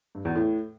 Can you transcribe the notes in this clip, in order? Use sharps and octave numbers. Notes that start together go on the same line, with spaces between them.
G2
E2
A2